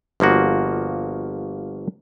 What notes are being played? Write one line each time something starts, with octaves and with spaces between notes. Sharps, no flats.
G1 F3 A#3 F#4